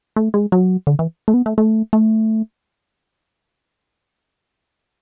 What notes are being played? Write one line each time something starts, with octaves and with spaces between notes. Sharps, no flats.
A3
G#3
F#3
D3
E3
A3
B3
A3
A3
A3